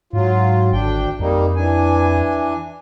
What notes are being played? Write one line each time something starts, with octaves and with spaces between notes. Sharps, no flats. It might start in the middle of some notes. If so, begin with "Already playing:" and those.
G#2 F#3 F4
G#1 D2 D4 G5
F2 G3 A#3 D#4
E3 D4 G#5